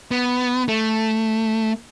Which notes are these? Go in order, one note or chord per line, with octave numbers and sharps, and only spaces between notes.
B3
A3